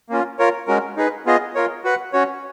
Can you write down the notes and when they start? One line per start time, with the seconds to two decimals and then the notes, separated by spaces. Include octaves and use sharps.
0.10 A#3 C#4 F4
0.39 F4 A#4 C#5
0.67 G#3 C#4 F#4 A#4
0.96 D#4 G#4 B4
1.26 B3 F4 G#4 D#5
1.55 F4 A#4 C#5
1.84 F#4 B4 F#5
2.13 C#4 F#4 C#5